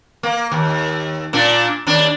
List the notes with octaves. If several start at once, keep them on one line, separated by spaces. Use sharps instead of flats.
A#3
D#2
A#2 D4
D#2 D4